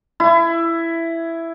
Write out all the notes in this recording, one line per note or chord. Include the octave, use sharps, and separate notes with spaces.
E4